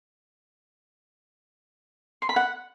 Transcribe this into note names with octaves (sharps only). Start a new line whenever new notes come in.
C6
B5
F#5